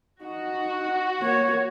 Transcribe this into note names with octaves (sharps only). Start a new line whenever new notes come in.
D#4 F#4
A#3 C#5